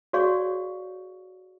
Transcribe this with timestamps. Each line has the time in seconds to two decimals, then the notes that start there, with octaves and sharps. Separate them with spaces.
0.13 F#4 G#4 C#5 D5 F5 C#6